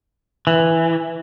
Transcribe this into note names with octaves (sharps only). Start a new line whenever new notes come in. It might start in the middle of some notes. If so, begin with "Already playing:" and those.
E3